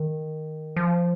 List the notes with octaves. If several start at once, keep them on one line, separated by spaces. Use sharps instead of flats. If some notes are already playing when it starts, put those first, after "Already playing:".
Already playing: D#3
F3